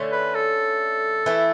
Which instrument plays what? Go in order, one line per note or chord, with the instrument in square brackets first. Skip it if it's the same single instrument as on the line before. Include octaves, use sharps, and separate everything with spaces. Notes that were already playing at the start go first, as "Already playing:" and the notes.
Already playing: [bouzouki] D3 A3 C#4
[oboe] B4
A4
[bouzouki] E3 A3 E4